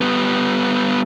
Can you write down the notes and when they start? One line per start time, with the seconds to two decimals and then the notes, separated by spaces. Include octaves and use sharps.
0.01 G3 B3